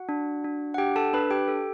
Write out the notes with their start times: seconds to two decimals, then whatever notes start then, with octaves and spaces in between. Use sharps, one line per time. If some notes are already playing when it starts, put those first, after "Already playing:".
Already playing: F#4 F#5
0.09 D4
0.44 D4
0.74 F#5
0.78 D4 G4 G5
0.96 A4 A5
1.13 D4 B4 B5
1.30 G4 G5
1.48 A4